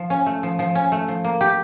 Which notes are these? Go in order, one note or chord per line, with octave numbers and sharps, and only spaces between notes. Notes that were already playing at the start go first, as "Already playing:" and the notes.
Already playing: F3
C#4
A3
F3
F3
C#4
A3
F3
A#3
G4